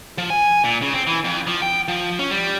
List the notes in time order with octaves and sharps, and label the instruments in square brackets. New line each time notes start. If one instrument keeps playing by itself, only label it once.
[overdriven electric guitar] F3
G#5
A#2
C#3
C4
E3
F2
F3
G5
F3
C#4
G3